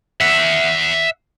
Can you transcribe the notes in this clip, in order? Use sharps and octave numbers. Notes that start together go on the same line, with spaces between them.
E5 F#5